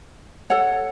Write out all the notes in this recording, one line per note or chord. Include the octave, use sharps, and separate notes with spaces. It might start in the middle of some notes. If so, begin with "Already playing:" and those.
A4 C#5 F#5